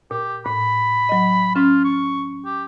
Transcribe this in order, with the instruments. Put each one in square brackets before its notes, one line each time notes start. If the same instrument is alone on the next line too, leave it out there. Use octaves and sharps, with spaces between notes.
[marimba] A#2 [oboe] G4
[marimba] A2 [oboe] B5
[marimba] F#3 D#5
[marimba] C#4 [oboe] F4
[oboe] C#6
G4